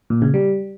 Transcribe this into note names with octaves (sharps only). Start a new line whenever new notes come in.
A#2
C#3
G3